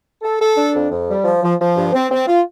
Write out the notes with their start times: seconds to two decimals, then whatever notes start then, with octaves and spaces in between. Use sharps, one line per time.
0.22 A4
0.39 A4
0.56 D4
0.74 F2
0.91 F2
1.08 G3
1.24 F3
1.42 F3
1.58 F3
1.76 G2
1.93 C4
2.10 C4
2.27 F4